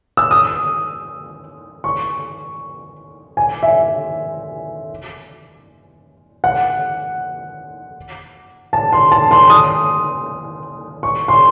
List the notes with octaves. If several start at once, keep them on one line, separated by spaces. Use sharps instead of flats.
E6
D#6
C#6
G#5
E5
F#5
A5
C6
A5
C6
D#6
C#6
C6